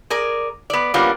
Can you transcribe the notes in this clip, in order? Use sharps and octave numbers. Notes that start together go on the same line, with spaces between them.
G#4 A#4 D5
B3 D5
G3 A#3 B3 C#4 D4 F4